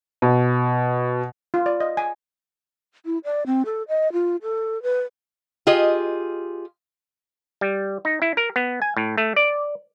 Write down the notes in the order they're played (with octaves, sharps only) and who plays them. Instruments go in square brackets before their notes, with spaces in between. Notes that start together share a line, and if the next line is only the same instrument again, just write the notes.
[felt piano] B2
[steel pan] F4
D5
D#5
G#5
[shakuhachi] E4
D5
C4
A4
D#5
F4
A4
B4
[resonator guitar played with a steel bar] F4 G4 G#4 D#5
[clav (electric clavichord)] G3
D#4
E4
A#4
B3
G#5
A2
A3
D5